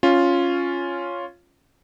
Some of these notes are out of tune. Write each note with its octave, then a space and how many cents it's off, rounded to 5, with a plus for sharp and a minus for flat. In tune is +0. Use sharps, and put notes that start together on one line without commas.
C#4 +0 F4 +0